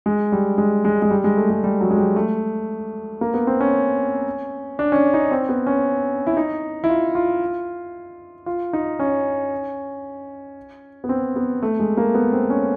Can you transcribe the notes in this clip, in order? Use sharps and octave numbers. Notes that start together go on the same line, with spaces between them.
G#3
G3
G#3
G#3
G#3
G3
G#3
A3
G#3
G3
F#3
G#3
G3
A3
A#3
B3
C4
C#4
D4
C#4
D4
D#4
C4
B3
C#4
E4
D#4
E4
F4
F4
F4
D#4
C#4
B3
C4
B3
A3
G#3
A#3
B3
C4
C#4